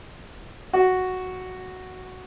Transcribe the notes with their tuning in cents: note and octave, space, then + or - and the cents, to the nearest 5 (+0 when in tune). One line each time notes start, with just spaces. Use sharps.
F#4 +0